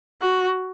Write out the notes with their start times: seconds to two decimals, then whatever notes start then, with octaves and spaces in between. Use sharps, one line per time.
0.21 F#4